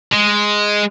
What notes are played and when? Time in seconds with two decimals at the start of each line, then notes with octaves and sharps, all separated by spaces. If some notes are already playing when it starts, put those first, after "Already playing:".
0.12 G#3